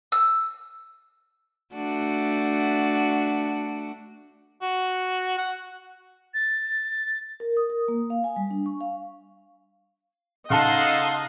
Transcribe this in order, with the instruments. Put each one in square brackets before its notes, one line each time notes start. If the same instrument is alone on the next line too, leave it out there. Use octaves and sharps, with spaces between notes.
[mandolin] E6
[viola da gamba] A3 D4 F#4
[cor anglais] F#4
F#5
[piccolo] A6
[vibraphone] A#4
D#6
A#4
A#3
F5
G#5
G3
D4
C#6
F5
[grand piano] C#3 A5 [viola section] D#4 D#5 [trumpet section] A4 F#5 C6 [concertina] F5